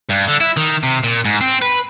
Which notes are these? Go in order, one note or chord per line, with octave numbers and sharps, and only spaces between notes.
G2
D3
E4
D#3
C3
A#2
G#2
C4
B4